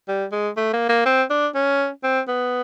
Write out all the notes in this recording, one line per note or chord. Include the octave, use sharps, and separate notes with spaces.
G3
G#3
A3
A#3
A#3
C4
D4
C#4
C4
B3